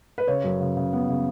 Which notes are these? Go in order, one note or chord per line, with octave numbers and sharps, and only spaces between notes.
B4
C#3 C#5
F#2
C#3
C#3
B3
C#3